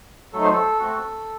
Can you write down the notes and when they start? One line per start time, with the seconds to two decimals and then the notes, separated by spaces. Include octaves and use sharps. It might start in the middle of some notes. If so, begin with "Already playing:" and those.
0.33 F#3 A3 D#4 A4
0.43 C5
0.53 A4
0.80 A3 C4 F#4